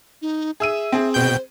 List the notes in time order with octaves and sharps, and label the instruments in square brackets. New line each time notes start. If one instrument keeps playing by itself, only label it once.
[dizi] D#4
[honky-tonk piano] G#4 E6 D#7 [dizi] E5
[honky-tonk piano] C4 G#4
[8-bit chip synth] B2 G5 G6 [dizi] C5